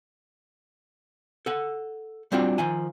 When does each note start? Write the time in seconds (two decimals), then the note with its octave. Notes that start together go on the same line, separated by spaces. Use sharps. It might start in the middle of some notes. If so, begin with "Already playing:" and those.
1.46 A4 F#5
2.32 G3 C4 D4 F4 F#4
2.58 D#3 F3 G#5